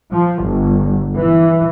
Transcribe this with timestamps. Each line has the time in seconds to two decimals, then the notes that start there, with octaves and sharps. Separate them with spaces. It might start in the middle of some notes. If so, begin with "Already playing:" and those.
0.12 F3
0.44 G1
1.16 E3